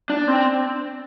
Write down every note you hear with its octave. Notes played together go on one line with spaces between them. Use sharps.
D4
C4